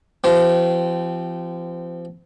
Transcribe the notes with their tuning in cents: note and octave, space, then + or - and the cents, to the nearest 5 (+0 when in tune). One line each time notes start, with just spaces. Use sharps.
F3 -25 C4 -25 G4 -40